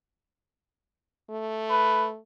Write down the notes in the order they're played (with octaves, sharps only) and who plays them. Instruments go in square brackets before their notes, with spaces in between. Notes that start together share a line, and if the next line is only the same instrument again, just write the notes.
[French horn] A3
[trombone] B4